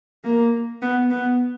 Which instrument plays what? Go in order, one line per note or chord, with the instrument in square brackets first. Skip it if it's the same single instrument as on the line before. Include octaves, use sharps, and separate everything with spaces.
[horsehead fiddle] A#3
B3
B3